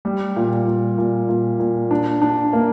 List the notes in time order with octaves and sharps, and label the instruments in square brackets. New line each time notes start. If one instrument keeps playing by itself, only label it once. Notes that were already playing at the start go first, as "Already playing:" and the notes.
[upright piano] G3
A#2
A#2
A#2
A#2
A#2
D4
D4
A#3